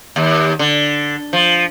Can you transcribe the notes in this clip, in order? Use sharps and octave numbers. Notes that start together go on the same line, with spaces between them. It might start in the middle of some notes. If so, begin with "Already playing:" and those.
D#2
D3
F3